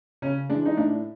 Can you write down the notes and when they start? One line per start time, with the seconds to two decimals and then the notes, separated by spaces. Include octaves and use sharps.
0.22 C#3 C#4
0.49 E3 G#3 D4
0.65 D#4
0.77 A2 D4